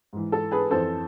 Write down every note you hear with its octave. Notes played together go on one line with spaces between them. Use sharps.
G#2 E3
A4
G#4 B4
F2 E3 A4 C5